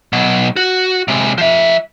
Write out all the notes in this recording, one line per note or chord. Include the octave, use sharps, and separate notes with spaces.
B2 F#3
F#4
C3 G#3
F3 E5